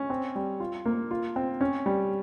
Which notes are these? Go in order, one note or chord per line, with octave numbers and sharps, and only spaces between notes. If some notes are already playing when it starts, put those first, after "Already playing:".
Already playing: C#4
C4
G3
F4
A#3
F4
C4
C#4
G3